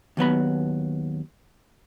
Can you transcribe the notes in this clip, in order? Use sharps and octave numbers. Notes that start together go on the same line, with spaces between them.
D#2 F#3 B3 B5